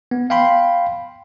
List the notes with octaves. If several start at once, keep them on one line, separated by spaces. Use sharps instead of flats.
B3
F5 G5 B5 C6